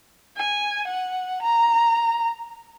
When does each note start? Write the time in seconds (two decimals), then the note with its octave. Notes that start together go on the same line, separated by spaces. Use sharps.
0.37 G#5
0.88 F#5
1.42 A#5